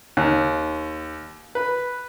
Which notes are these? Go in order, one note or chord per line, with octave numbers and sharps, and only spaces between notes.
D#2
B4